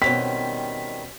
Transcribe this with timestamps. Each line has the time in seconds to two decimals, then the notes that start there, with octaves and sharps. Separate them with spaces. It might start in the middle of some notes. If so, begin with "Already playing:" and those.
0.02 B2 D#3 G3 C4 C#4 C5 B6